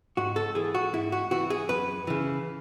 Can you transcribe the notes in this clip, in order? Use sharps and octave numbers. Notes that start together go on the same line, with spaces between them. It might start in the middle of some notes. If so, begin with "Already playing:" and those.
G#2 F#4
A4
E3 G#4
F#4
G#2 E4
F#4
E3 F#4
G#4
F#2 B4
C#3 E3